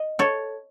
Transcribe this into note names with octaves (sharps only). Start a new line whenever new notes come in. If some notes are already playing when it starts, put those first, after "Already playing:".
Already playing: D#5
A4 C#5